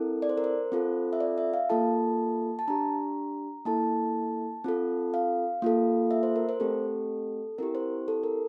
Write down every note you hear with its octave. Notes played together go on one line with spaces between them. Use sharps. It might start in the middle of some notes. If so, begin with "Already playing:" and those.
Already playing: C4 E4 A4 A#4
D5
C5
A#4
C5
C4 F4 A4
E5
D5
E5
F5
A#3 F4 A4 A5
A5
D4 G4 A#5
A#3 E4 A4 A5
C4 F4 A4
F5
A#3 F4 A4
E5
C5
A#4
C5
A3 C4 G4 A4
C4 E4 G4 A#4
C5
A4
A#4